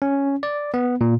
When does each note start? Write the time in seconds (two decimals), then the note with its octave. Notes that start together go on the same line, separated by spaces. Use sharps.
0.02 C#4
0.43 D5
0.74 B3
1.01 A#2